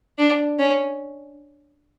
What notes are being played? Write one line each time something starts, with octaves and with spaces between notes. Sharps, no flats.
D4
C#4